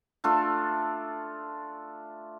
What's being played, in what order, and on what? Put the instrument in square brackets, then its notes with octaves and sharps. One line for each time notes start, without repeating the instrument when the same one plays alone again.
[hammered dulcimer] A3 D4 F4 A4